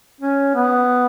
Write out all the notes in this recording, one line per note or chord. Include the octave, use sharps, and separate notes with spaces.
C#4
B3